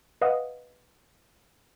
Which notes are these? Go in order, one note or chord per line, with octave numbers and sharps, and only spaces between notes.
B4 D#5 F5 F#5 D#6